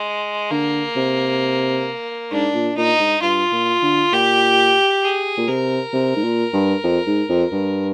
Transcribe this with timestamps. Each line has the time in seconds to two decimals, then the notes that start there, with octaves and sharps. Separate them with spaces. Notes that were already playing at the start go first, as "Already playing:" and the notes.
Already playing: G#3
0.51 D3 A#3
0.96 C3
2.31 G#2 D4
2.54 A#2
2.77 A#2 D#4
3.00 G#2
3.22 G2 F4
3.52 A#2
3.83 D3
4.12 A#2 G4
5.03 G#4
5.37 A#2
5.47 C3 A#4
5.93 C3
6.16 G#2
6.23 A#2
6.53 G2
6.84 F2
7.07 G#2
7.29 F2
7.51 G2